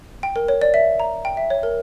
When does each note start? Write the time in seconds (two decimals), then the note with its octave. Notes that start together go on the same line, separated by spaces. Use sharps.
0.23 G5
0.36 A#4
0.48 C#5
0.62 D5
0.74 E5
1.00 A#5
1.25 G5
1.37 E5
1.50 C#5
1.63 A#4